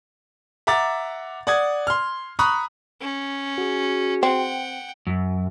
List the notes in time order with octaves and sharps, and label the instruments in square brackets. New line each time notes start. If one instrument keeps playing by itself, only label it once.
[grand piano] E5 F#5 A#5 D6 A6
D5 F#5 D#6 G#6
C6 F6
A#5 B5 C#6 D#6 F#6
[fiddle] C#4
[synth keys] F#4 G#4
[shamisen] C4 [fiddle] F#5 G5
[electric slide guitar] F#2